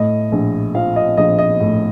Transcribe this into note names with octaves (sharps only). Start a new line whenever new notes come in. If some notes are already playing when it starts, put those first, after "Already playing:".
Already playing: A2 D#5
A#1
F3 F5
D#5
A#1 D#5
D#5
A2